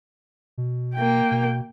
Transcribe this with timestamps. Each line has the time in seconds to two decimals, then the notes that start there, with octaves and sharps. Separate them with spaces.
0.58 B2
0.95 A#3 G5
1.31 B2